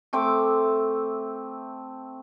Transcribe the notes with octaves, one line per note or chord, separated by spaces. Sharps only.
A3 C4 E5 D6